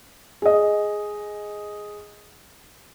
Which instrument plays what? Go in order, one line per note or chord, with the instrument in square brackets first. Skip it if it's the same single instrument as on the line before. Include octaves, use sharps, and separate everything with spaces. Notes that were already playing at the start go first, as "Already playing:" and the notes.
[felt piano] G#4 D#5